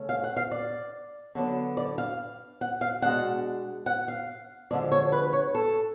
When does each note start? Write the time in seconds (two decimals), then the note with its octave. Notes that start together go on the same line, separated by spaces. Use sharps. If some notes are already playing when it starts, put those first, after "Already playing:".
Already playing: C#3 A3 C#4
0.09 F5
0.24 F#5
0.36 F5
0.51 D5
1.35 D3 F#3 B3 D4
1.77 D5
1.98 F5
2.61 F#5
2.81 F5
3.02 B2 G#3 D4 F#5
3.86 F#5
4.08 F5
4.71 D3 F3 G#3 D4 D5
4.92 C#5
5.12 B4
5.33 C#5
5.55 A4